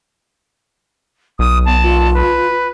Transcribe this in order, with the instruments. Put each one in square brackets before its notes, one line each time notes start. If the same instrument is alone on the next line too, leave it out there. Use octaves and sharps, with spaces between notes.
[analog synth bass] B1 [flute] D#6
[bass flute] B3 [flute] A5
[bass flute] F4
[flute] B4